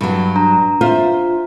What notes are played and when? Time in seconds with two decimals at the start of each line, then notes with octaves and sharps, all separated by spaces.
0.01 G2 F#3
0.36 D4 A#5
0.81 F4 C5 E5